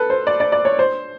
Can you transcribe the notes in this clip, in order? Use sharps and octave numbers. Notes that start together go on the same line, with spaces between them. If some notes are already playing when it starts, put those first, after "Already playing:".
Already playing: A4 B4
C5
D5
D5
D5
C#5
C5